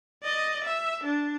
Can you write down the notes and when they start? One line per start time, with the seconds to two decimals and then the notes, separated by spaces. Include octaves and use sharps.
0.23 D5 D#5
0.64 E5
1.03 D4